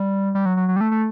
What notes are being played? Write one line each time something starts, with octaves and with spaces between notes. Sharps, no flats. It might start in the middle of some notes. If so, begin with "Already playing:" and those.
Already playing: G3
G3
F#3
F#3
F#3
G3
A3
A3